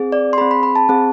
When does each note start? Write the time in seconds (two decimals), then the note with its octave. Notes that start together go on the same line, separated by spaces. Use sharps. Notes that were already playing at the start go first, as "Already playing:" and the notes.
Already playing: C4 G#4
0.12 D5
0.33 C6
0.38 C4 G#4 B5
0.51 B5
0.63 B5
0.76 A5
0.89 C4 G#4